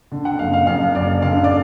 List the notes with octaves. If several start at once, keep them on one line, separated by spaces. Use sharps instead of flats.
D3
F#5
F#1 F5
F5
F#2 F5
F#1 D5
D3 F5
D5